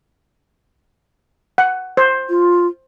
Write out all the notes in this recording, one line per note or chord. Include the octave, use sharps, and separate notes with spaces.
F#5
C5
F4